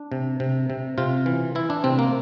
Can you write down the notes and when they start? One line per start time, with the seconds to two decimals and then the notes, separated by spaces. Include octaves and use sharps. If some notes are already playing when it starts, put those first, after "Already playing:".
Already playing: D4
0.12 C3
0.40 C3
0.70 C3
0.98 C3 F4
1.26 E3
1.55 E3 E4
1.70 D4
1.84 C3 C4
1.99 A#3